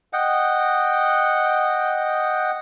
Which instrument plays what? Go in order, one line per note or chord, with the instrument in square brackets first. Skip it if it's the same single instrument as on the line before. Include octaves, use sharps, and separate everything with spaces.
[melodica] D#5 F#5 G5